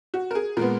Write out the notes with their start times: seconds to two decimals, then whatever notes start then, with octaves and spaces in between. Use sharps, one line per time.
0.14 F#4
0.31 A#4
0.35 G#4
0.57 A#2 G#3 B3 A#4